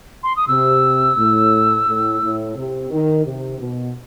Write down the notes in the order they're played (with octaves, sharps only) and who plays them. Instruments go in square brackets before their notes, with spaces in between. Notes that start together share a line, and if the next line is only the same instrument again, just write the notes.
[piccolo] C6
D#6
[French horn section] C3 [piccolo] E6
[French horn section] A2
A2
A2
C3
D#3
C3
B2